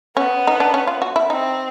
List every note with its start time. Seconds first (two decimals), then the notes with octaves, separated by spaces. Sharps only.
0.17 B3 C#4
0.47 D#4
0.60 D4
0.74 C#4
0.87 F4
1.02 F#4
1.16 E4
1.30 C4 D#4